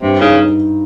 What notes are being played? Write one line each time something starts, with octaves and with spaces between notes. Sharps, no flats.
G2 C3
C#3 D#4